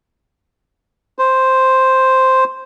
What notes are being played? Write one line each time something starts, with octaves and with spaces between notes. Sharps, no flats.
C5